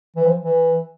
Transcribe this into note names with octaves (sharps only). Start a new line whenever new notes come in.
E3
F3
E3